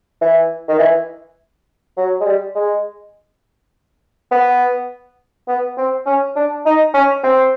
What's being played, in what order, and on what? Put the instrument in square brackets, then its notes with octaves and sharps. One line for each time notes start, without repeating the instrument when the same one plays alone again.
[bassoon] E3
D#3
E3
F#3
G#3
G3
G#3
B3
B3
C4
C#4
D4
D#4
C#4
C4